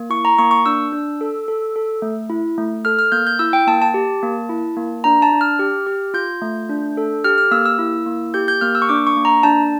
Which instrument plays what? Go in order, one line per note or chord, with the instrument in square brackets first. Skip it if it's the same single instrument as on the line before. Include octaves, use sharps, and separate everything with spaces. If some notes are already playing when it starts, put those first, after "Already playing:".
Already playing: [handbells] A#3
E4 C#6
A#5
A#3 C#6
C#6
D4 E6
D4
A4
A4
A4
A3
E4
A3
A4 F6
F6
A#3 G6
G6
E4 E6
G5
A#3 A5
A5
G4
A#3
E4
A#3
D4 A#5
A5
D4
F6
G4
G4
F4 G6
A3
D4
A4
G4 F6
F6
A#3 E6
E6
E4
A#3
G4 G6
G6
A#3 F6
E6
C#6
D4 D6
C#6
A#3
A#5
D4 A5